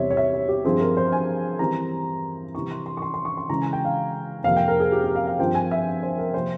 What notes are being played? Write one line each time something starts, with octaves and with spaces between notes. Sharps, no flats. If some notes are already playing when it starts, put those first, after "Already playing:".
Already playing: E2 C3 G3 C4 E4 C#5 E5
C#5
E5
C#5
G4
G2 F3 C4 G#4
A#4
C5
G#5
E3 G3 C4 A#5
C3 E3 G3 C4 E4 C#6
C6
C6
C#6
C6
C6
C#6
C6
C#3 E3 G#3 C#4 A#5
G#5
G5
F5
F2 C3 F3 A#3 F5
G5
A#4
G#4
G4
G4
F5
F5
G2 F3 C4 F4 G5
G#5
E5
C5
A#4
C3 F3 A#3 C5